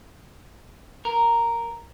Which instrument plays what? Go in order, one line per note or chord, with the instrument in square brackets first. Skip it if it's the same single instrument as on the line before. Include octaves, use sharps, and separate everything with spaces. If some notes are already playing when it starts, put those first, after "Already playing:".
[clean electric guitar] A#4